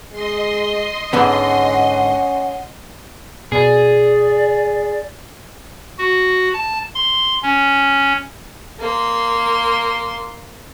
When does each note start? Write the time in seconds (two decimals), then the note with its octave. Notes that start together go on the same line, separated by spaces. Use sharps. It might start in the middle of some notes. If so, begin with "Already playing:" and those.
0.12 G#3 D#5 C6
1.13 G#2 D3 B3 C#4 F#5
3.52 B2 G#4 D5
5.98 F#4
6.53 A5
6.95 C6
7.43 C#4
8.79 A#3 C6